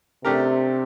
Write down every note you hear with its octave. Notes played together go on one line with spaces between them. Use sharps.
C3 A3 D4 G4 A#4